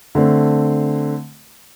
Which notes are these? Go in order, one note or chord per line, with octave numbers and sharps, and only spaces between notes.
D3 A3 C4